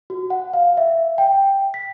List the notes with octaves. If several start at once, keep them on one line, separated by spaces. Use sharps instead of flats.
F#4
F#5
F5
E5
G5
B6